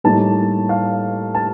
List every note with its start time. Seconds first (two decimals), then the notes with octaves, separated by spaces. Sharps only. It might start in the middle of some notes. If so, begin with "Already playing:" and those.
0.04 A2 G3 A#3 D#4 A5
0.69 F5
1.35 A5